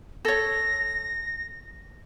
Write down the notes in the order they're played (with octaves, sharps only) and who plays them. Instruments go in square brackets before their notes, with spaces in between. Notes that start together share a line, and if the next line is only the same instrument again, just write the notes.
[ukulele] A4 C#5 [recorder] A#6